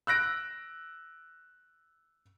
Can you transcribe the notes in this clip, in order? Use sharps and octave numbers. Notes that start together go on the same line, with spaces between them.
E6 F#6 A#6 D7